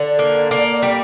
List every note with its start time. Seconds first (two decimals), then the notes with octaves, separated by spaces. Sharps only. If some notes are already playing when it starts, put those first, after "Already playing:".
Already playing: D3 D5
0.19 A#3
0.51 A#3
0.83 G3